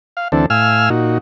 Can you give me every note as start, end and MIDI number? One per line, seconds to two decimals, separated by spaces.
0.17 0.28 77
0.32 0.46 38
0.32 0.46 52
0.32 0.46 60
0.32 0.46 62
0.32 0.46 69
0.50 0.89 45
0.50 0.89 77
0.50 0.89 80
0.50 0.89 88
0.50 0.89 89
0.90 1.18 46
0.90 1.18 63
0.90 1.18 66